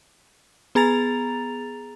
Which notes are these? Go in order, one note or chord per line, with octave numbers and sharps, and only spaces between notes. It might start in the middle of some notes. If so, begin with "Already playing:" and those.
B3 G#4 A#5 A6 F7